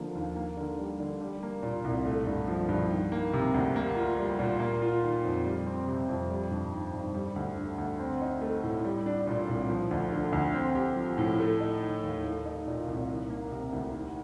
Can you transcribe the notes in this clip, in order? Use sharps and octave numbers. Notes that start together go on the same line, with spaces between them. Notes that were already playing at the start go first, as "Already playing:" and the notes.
Already playing: D3 F3 A#3
D#2
A#3
D3
G3
D3
G3
A#3
A#2
C2
A3
G2
F3
G2
D#3
A#3
C3
D2
A#3
F4
G3
A#2
A#3
F4
D#3
F2
G3
C4
C3
F2
G3
G2
D#3
G2
G3
D2
D3
D2
C4
D#4
A3
A2
G3
D4
A#2
C2
F3
D2
D3
D2
C4
G4
F3
A2
A3
D#4
D#3
D#2
A3
D#4
A#2
C2
D#3
A#3
C3
D2
D#3